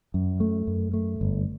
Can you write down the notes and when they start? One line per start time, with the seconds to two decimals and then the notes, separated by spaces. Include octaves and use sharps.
0.14 F#2
0.40 A3
0.67 F#2
0.94 A3
1.21 G1